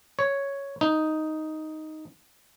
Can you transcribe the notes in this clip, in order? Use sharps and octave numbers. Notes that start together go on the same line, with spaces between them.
C#5
D#4